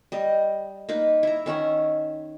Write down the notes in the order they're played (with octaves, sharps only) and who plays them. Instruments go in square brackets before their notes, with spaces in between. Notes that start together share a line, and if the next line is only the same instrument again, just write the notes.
[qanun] G3 D#5
A#3 D#4 B4
E4 A#5
D#3 C#4 E5 F#5